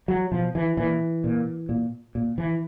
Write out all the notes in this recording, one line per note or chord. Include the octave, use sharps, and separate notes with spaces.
F#3
B2 F3
E3
A#2 E3
A#2
A#2
A#2
E3